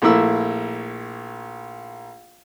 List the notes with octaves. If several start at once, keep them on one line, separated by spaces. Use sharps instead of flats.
A#1 A3 A#3 E4 E6